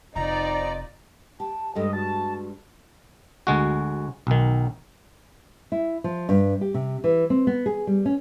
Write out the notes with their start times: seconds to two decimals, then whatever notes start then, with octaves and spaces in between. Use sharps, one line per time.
0.16 F1 C4 D#4 F4 D5 D#5 A#5
1.40 G4 A5
1.75 G2 G#3 G4 A4 D#5
1.93 F#4 A5
3.47 D2 G#3 F#4
4.27 B1 D#3
5.72 E4
6.04 F3
6.29 G2
6.61 G4
6.74 C3
7.04 E3
7.30 C4
7.47 B3
7.66 G#4
7.87 G3
8.05 C#4